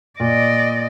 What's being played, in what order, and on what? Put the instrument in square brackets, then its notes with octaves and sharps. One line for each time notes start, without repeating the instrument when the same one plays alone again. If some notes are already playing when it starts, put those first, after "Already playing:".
[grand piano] A#2 [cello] D5 D#5